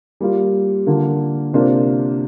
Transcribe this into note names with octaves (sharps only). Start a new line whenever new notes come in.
G3 A#3 F4
D3 A#3 F4
C3 A#3 D4 F4 C5